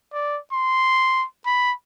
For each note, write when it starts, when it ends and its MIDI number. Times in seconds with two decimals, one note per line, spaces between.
0.13 0.39 74
0.52 1.25 84
1.46 1.73 83